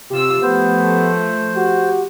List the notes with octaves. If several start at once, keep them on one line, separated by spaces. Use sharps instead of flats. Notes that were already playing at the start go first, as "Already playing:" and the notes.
C3 F4 G4 E6
F3 A3 B3 C5
F#4 G4